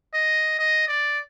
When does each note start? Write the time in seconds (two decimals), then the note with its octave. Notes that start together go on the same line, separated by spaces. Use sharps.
0.14 D#5
0.59 D#5
0.88 D5